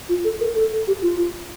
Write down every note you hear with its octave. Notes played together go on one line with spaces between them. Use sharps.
F4
A4
A#4
A4
G4
F4